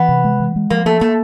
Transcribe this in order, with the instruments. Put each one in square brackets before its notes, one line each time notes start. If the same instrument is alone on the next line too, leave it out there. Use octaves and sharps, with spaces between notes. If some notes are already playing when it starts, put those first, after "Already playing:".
Already playing: [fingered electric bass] E3 [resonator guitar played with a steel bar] B3
[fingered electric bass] C3
G#3
E3
G#3
[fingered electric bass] F3 [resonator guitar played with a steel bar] A#3
[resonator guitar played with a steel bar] A3 [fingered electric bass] A#3
[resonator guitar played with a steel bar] A3 [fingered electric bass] A#3